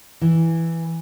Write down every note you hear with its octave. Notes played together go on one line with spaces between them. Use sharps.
E3